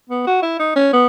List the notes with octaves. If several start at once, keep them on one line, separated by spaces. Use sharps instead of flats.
B3
F#4
E4
D#4
C#4
B3